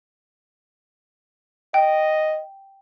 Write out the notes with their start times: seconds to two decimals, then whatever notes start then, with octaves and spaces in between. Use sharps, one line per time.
1.74 D#5 G5